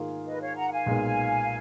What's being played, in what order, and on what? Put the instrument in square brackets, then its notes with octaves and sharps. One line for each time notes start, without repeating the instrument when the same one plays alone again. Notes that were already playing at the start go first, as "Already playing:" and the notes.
Already playing: [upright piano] G#2 D#3 A#3 F4 G#4
[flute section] B4 D#5
C#5 F5
F#5 A#5
F5 G#5
[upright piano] B1 A#2 G#3 B3